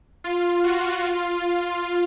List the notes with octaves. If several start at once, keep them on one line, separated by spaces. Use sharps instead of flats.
F4
F#4
F4
F4